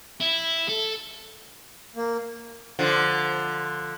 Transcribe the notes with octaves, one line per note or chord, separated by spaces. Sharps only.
E4
A4
A#3
D3 F3